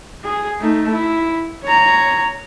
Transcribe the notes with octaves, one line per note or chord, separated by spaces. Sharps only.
G#4
A3 D#4
E4
C#5 A#5